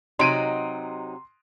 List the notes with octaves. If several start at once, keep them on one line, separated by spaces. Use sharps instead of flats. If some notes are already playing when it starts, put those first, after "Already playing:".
C3 F#3 D#4 C6 D7 D#7